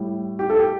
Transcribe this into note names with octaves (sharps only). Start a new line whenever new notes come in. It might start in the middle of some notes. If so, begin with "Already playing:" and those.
Already playing: A2 G3
G4
A4
G4